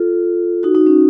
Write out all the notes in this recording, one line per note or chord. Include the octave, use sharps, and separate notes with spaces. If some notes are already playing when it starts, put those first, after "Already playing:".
Already playing: F4 A4
D#4 F#4
D#4
C#4